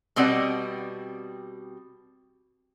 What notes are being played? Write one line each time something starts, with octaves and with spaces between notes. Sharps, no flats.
B2 G3 C4 D5 D#5 F#5